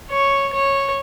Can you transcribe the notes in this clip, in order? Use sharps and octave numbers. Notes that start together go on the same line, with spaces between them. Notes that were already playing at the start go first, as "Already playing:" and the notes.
C#5
C#5